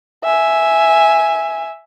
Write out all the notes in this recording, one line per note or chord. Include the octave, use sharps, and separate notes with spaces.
E5 G#5